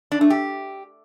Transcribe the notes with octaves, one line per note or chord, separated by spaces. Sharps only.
D4
A3
G4